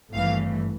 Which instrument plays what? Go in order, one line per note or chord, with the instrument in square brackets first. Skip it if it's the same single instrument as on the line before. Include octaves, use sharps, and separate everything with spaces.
[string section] G#1 G2 E3 A3 F5